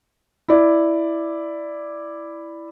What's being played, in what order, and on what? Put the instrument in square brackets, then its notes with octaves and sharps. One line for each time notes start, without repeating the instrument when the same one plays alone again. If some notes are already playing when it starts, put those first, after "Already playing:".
[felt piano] E4 D5